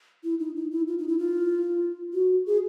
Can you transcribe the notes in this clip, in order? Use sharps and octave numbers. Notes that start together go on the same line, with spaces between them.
E4
D#4
D#4
E4
F4
D#4
E4
F4
F#4
G#4